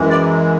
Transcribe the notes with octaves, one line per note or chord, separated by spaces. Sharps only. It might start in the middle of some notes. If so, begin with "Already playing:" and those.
Already playing: F#2 E3 G#3
D5